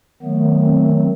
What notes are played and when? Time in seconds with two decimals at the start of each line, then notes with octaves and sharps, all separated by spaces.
0.22 D#3 F#3 A3 B3
0.63 C4